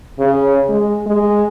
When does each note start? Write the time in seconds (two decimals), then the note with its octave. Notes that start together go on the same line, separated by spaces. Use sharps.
0.19 C#3
0.69 G#3
1.06 G#3